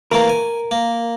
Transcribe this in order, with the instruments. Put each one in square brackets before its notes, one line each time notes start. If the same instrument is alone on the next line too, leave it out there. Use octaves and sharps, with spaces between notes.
[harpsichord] E3 A3 A#3 [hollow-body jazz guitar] A#4
[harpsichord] G#5
A#3